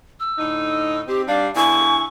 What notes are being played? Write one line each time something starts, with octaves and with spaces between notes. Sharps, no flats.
E6
A2 D3 D#4
C4 G4
G3 D4 F5
D3 B3 E4 G#5 C#6